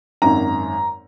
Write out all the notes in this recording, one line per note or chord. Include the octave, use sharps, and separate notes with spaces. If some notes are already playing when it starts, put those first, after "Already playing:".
G#1 F#2 D#3 A#5